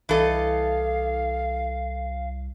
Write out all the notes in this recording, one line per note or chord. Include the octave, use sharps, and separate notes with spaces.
C2 E3 A4 D#5 F5